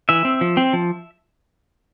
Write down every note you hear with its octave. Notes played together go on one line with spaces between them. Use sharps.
E3 E5
C4
F3
C4
F3